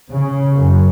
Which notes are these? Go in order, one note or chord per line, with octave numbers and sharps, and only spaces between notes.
C#3
F#2